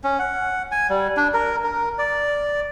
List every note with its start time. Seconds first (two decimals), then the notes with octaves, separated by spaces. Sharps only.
0.04 C#4
0.19 F#5
0.71 G#5
0.90 G3
1.17 D4
1.34 A#4
1.64 A#4
1.98 D5